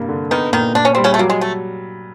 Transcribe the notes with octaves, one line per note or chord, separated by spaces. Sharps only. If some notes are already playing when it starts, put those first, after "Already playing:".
Already playing: G2 C3 G3 A#3
D3
D#3 B3 D#4
A#2 D#3 D#4
A#2 D4
C#4
G3 C4
C#3 C#4
A3
F#3 A#3
G#3
A3